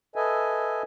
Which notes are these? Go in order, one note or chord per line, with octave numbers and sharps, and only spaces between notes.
A4 B4 D#5 E5 G#5